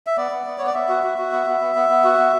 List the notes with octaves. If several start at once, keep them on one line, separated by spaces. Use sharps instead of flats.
E5
B3 D5
B3
B3
B3 C#5
D5
B3 E5
F#4
F#4
F#4
B3
B3
B3
B3
B3
F#4
B3